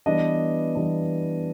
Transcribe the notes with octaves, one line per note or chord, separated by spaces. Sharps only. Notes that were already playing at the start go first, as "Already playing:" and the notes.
E3 G3 B3 D4 D#5
E3 G3 B3 D4